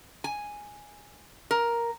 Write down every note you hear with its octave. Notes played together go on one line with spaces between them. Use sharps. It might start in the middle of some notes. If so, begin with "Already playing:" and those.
G#5
A#4